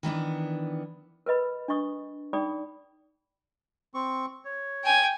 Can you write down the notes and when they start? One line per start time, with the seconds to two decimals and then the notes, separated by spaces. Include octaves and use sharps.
0.03 D#3 E3 B3 D4
1.26 A#4 B4 D#5 B5
1.68 D4 D#5 C#6 D#6
2.33 D#4 G#4 D5 G5 B5 D#6
3.94 C4 C#6
4.45 C#5
4.84 G5 G#5